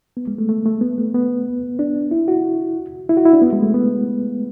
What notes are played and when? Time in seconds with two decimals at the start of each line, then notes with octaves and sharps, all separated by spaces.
0.17 B3
0.28 G#3
0.38 A3
0.49 A3
0.66 A3
0.81 B3
0.98 A3
1.14 B3
1.79 D4
2.11 E4
2.28 F#4
3.09 E4
3.17 F#4
3.25 E4
3.33 D4
3.42 B3
3.53 G#3
3.63 A3
3.74 B3